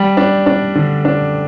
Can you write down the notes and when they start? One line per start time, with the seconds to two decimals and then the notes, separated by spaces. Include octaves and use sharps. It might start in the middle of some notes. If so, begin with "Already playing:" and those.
Already playing: G3
0.17 D4
0.46 D4
0.75 D3
1.05 D4